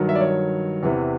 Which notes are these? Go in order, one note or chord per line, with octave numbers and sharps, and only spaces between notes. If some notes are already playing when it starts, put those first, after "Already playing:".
Already playing: G2 D#3 F#3
E5
D5
C#5
E2 C3 E3